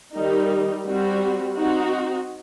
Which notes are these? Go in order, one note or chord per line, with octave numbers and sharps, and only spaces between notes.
D#3 G3 D#4
G3 C4 F#4
C4 D#4 F#4